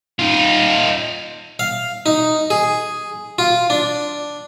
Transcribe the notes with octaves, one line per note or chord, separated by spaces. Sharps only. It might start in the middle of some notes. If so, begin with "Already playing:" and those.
D#4 F4
F5
D#4
G#4
F4
D4